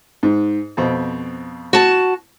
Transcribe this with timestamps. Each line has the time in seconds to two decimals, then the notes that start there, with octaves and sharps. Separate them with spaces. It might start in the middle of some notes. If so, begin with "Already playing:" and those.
0.23 G#2
0.77 F2 B2 C4
1.73 F#4 A5